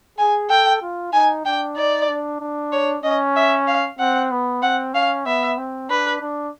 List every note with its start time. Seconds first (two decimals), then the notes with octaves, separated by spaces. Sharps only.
0.18 G#4 G#5
0.50 A4 G5
0.82 F4
1.13 D#4 G#5
1.45 D4 G5
1.76 D#4 D5
2.09 D4
2.40 D4
2.72 C#5
3.03 C#4 D#5
3.36 E5
3.68 F5
3.99 C4 F#5
4.31 B3
4.62 C4 F#5
4.94 C#4 F5
5.26 B3 E5
5.58 C4
5.90 D4 B4
6.21 D4